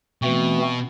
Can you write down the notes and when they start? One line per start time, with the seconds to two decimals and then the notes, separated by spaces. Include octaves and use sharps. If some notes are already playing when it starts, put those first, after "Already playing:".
0.22 B2 E3 A3 C4 F#4